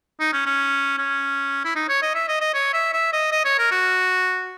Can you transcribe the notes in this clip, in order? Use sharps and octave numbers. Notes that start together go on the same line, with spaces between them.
D#4
C#4
C#4
C#4
E4
D#4
C#5
D#5
E5
D#5
D#5
C#5
E5
E5
D#5
D#5
C#5
A#4
F#4